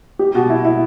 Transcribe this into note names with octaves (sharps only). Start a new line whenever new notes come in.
G4
B2
E4
E4